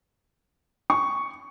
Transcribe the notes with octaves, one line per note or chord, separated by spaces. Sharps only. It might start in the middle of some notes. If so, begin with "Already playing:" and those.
C#6